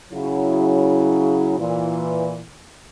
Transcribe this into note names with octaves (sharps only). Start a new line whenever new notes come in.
C#3 F#3 E4
A#2 E3